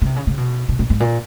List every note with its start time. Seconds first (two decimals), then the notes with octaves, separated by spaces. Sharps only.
0.02 C#3
0.06 C3
0.16 C#3
0.27 C#3
0.38 B2
0.69 B2
0.79 A#2
0.90 G#2
1.00 A#2